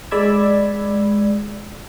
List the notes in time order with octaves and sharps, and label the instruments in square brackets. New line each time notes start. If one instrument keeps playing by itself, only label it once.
[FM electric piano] G#3 D5 B5 E6 G#6